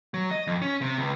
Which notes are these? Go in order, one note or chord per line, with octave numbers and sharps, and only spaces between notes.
F#3
D#5
F2
C#4
C3
C#2